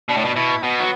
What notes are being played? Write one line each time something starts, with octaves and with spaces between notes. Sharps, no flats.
B2 D4
A2
B2
B2 E4
B2 B3
F#3